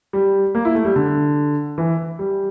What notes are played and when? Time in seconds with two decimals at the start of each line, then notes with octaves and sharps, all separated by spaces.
0.13 G3
0.55 A#3
0.65 E4
0.75 A3
0.85 G3
0.96 D3
1.78 E3
2.19 G3